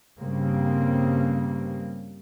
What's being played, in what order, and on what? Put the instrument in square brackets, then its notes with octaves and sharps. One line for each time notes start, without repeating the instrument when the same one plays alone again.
[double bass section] G2 C#3 G3 A#3 C4